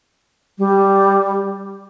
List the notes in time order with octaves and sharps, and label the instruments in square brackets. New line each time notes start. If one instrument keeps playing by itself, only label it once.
[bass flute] G3